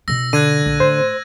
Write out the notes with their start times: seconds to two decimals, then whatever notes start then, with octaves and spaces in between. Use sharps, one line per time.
0.08 B2 D4 E6 A#6
0.33 D3 F#6 G#6 D#7
0.66 A#1
0.80 A2 C5